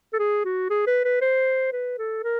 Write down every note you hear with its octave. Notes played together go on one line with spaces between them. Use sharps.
A4
G#4
F#4
G#4
B4
B4
C5
B4
A4
A#4